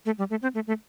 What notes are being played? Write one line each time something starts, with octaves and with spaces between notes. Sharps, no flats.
A3
G3
A3
C4
A3
A3